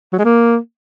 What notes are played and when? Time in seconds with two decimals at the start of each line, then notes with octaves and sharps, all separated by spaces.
0.13 F#3
0.19 G#3
0.25 A#3